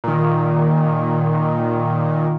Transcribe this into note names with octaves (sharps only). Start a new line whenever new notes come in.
A#2 D#3